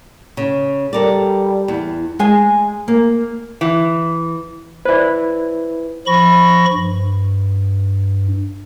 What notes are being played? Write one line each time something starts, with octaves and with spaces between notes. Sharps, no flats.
C#3
G3 A4 A#4 D5
E2
G#3 G#5
A#3
E3
E4 B4 C5 D5
F3 B5 C#6 A#6
G2